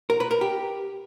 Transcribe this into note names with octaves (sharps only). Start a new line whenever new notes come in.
A#4
B4
A#4
G4